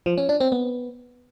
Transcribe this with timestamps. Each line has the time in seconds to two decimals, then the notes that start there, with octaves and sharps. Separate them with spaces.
0.06 F3
0.18 C#4
0.29 D4
0.40 C4
0.52 B3